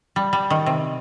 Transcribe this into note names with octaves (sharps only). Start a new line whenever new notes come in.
G3
G3
D#3
C3